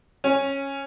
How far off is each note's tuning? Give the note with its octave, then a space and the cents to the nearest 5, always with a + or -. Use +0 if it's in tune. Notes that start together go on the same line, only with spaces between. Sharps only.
C#4 -10